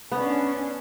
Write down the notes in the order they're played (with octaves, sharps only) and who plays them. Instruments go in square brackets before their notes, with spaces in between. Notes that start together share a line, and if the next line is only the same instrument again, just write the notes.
[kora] B3 [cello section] C#4 D4